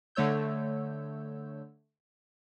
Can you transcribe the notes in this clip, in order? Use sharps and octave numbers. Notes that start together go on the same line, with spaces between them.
D3 A3 C#5 E6 G6